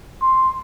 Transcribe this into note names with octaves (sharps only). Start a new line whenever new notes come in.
C6